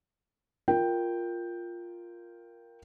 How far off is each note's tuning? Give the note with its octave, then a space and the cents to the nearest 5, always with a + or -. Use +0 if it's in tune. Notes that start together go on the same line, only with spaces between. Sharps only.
F4 +0 A#4 +0 G5 +0